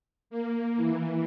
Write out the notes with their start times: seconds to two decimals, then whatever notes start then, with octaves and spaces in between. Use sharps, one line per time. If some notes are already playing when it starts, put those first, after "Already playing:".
0.30 A#3
0.77 E3